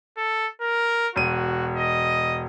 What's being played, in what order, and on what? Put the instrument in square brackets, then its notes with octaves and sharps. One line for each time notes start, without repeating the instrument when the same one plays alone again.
[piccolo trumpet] A4
A#4
[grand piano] E1 D#7 [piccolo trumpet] F#4
[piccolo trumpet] D#5